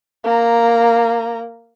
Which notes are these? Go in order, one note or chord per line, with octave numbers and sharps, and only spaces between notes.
A#3 A#5